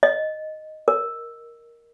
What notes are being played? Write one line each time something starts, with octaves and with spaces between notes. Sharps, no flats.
D#5
A#4